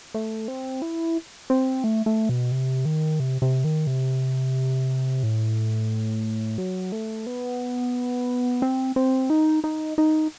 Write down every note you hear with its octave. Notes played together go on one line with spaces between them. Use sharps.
A3
C4
E4
C4
A3
A3
B2
C3
D#3
C3
C3
D#3
C3
A2
F#3
A3
B3
C4
C4
D#4
D#4
D#4